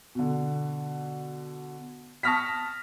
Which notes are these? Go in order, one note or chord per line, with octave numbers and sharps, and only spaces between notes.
B2 D3
A5 C#6 D#6 F6 A#6 B6